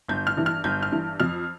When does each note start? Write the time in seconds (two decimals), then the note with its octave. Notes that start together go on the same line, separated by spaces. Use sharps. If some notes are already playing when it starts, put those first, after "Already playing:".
0.08 G1 G6
0.27 F6
0.37 G2 E3
0.46 F6
0.64 G1 G6
0.83 F6
0.92 G2 E3
1.20 F2 F6